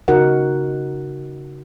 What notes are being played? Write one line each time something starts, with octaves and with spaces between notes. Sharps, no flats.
C#3 D#4 F#4 A#4 F#5